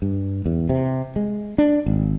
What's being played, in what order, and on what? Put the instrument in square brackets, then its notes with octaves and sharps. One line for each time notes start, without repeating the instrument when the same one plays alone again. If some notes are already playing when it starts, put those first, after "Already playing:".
[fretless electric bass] G2
E2
C3
G#3
D4
G#1